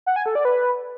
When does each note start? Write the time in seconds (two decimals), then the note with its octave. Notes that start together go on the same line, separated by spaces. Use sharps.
0.06 F#5
0.16 G#5
0.26 A4
0.35 D5
0.45 B4